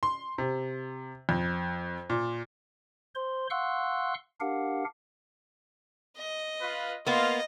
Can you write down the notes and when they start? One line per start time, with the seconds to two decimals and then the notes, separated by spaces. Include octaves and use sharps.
0.03 C6
0.38 C3
1.29 F2
2.10 A#2
3.15 C5 C6
3.50 F5 F#5 C6 C#6 E6 F#6
4.41 D4 G4 A#4 F5 F#5
6.17 D#5
6.61 F4 B4
7.06 A#3 B3 F4 D#5